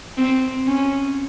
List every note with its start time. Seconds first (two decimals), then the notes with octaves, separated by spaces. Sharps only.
0.18 C4
0.67 C#4